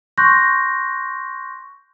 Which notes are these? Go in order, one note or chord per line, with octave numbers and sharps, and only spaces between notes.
C6 C#6 F#6 G6 A#6